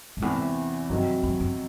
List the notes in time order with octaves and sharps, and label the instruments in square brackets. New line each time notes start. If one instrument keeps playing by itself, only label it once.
[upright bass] G#2
[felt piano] E2 C3 E3 [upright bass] A2
[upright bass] G2 [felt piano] C3 D#3 F#3
[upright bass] F#2
F#2